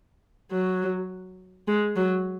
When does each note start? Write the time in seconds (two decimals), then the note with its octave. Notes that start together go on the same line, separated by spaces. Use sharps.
0.51 F#3
1.68 G#3
1.96 F#3